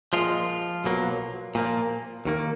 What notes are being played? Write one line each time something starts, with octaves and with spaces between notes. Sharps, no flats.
A#2 F3 G#3 F4
B1 B2 F#3 A#3
A#2 F3 A#3
D#2 D#3 A#3